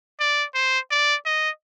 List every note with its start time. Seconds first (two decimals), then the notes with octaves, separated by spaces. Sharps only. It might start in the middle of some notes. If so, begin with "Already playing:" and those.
0.20 D5
0.55 C5
0.91 D5
1.26 D#5